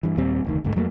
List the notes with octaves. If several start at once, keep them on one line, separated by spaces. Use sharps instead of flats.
G2 E3
D#2 A#2 G3 C4
F1 D2 D#3
F#1 D2 G#2 A3
F2 F#3 A3 A#3